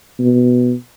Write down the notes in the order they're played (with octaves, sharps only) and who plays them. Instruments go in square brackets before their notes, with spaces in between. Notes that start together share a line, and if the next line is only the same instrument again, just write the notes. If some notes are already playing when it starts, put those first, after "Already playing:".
[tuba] B2